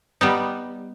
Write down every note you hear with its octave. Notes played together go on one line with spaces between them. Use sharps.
G3 B3 D#4